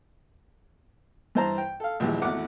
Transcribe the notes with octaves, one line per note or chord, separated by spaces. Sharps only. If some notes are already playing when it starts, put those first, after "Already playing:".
G2 E3 C5 A5 A#5
G5
A4 F5
A#1 D#2 E3 G3 G#3
G#1 E2 E3 A3 F#5 D6